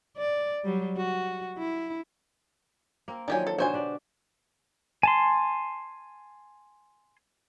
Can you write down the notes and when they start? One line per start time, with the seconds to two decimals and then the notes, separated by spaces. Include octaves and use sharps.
0.17 D5
0.64 F#3 G3
0.97 F#4
1.58 E4
3.08 A#3 C4 A#4
3.28 D#3 F3 F#3 D4 G4 G#5
3.47 A4
3.58 B2 D3 D#4 F#4 C5 G#5
3.73 D4 G4 D5
5.03 G#5 A5 C6